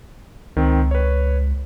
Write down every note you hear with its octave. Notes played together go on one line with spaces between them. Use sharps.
C#2 D#3 C4
B4 C#5